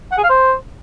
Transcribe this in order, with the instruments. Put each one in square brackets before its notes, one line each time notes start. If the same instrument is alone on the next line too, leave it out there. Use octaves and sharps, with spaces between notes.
[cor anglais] F#5
G#4
F5
C5